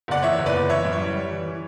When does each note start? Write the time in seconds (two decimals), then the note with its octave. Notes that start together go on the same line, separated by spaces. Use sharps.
0.08 F#1 D5 F#5
0.23 E2 C#5 E5
0.38 F#1
0.46 B4 D5
0.54 F#1
0.69 E3 C#5 E5
0.85 F#2
0.93 C#5
1.00 G3
1.16 G3
1.31 E3
1.47 E3